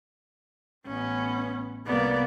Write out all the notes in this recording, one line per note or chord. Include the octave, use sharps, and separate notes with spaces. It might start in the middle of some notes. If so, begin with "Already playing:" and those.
A1 B3 C#4
C2 A#3 B3 D5